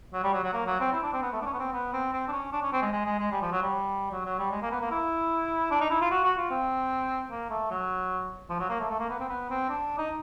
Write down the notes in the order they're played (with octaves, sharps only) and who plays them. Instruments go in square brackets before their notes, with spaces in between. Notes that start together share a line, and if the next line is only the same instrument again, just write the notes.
[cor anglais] F#3
G3
F#3
F#3
A#3
F#3
C4
E4
D4
C4
B3
A3
D4
C#4
B3
C4
B3
C4
C4
D4
C#4
D4
C#4
C4
G#3
G#3
G#3
G#3
G3
F3
F#3
G3
F#3
F#3
G3
G#3
A#3
B3
A#3
E4
D4
D#4
E4
F4
F#4
F#4
F4
C4
A#3
A3
F#3
F3
F#3
A#3
A3
A3
A#3
B3
C4
B3
C4
D4
D#4